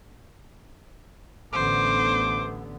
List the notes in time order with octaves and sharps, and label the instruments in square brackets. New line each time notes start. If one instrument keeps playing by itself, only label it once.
[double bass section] A1 D3 B3 [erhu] C5 [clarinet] D6